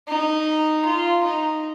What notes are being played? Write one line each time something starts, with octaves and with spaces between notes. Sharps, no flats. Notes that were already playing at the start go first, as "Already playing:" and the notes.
D#4
F4
D#4